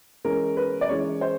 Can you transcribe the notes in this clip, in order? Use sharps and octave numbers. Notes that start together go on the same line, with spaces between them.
E3 G#3 C#4 A#4
B4
D5
E3 G#3 C#4 C#5
C5